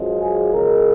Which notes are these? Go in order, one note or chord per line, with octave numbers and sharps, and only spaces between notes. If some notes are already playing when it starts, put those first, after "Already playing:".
Already playing: F#2 F3 G#3
G#4
C#2 C#3 G#3 A#4